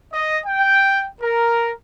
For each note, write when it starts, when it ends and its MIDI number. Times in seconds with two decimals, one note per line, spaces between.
0.13 0.39 75
0.46 1.06 79
1.21 1.72 70